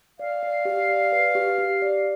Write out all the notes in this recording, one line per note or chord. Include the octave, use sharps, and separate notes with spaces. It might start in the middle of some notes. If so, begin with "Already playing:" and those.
D5 F5
D5
G4
D5
B4
G4
G4
D5